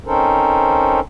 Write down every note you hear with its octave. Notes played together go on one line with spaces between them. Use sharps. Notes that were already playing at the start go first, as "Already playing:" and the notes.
C4 C#4 D#4 A4 A#4 C5